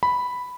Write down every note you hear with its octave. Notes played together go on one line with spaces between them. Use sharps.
B5